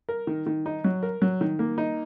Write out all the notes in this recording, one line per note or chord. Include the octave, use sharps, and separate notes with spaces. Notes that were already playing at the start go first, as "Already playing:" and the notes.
A#4
D#3
D#3
D#4
F#3
A#4
F#3
D#3
A#3
D#4